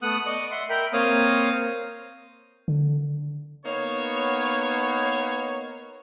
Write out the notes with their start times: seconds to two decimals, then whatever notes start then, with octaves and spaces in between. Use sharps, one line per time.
0.02 A3 B3 F#5 D#6 F#6
0.26 D5 D#5 C#6
0.51 E5 F#5 C6
0.69 A#4 E5 G5 B5
0.93 A#3 C4 C#5 F5 D#6
2.68 D3
3.65 A#3 B3 D#4 C#5